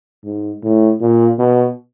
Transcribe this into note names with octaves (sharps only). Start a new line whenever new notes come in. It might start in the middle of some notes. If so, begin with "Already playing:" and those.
G#2
A2
A#2
B2